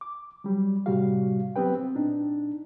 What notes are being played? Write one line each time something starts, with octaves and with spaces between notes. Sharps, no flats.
D6
F#3 G3
A2 C3 G3 F#4 G4 F5
F#3 B3 C4 G4 B4 G5
C4
A#2 D4 D#4